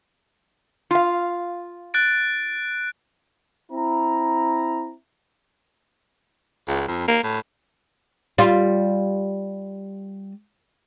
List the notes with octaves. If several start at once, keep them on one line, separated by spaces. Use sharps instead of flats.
F4 F5
F#6 A6 D7
C4 E4 A#5
C#2
F2
A#3
A2
G3 F4